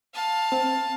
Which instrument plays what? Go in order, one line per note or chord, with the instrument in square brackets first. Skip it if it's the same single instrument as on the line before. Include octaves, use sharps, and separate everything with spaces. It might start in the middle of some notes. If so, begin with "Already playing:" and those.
[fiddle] F5 A5
[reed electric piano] C4